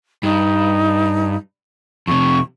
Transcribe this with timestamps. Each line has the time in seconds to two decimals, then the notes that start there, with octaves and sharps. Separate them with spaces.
0.23 G2 D#4
2.07 F2 C3 C#6